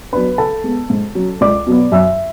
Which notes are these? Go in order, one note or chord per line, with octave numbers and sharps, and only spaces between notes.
F#3 B3 D4 B4 B5
C#3 A4 A5
G#3 B3
G#2
F#3 C#4
C#2 D5 D6
B2 F#3 B3
F#2 E5 E6